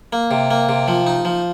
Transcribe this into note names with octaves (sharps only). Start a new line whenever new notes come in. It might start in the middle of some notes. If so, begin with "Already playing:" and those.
A#3
C3
A#3
C3
F3
D#4
F3